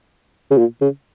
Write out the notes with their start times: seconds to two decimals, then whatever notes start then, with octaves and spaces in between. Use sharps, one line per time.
0.51 C#3
0.58 A#2
0.81 C#3